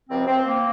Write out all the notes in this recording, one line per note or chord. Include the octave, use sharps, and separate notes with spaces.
C#2 C3 F3 C4
C4
A#3